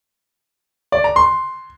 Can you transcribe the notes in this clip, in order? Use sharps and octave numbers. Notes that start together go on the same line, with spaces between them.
D5
A#5
C6